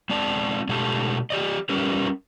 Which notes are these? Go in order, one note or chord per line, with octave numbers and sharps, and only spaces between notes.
G#3 C4 D5 A5
B2 G#3 A3 G4 A5
G4 D5 D#5
G3 C#4 G4 A#4 B4